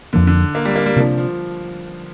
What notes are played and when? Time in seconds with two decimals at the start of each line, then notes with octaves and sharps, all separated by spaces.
0.13 F2 D3 F3 A#3
0.27 D3
0.55 A#3
0.65 G3
0.76 A#3
0.86 G3
0.96 C3 F3 A#3 D4
1.17 F3